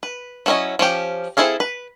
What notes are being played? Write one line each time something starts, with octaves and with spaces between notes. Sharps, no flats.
B4
F#3 A3 C#4 E4 D#5
F3 C#4 G4
C4 E4 G#4 A4 F5
B4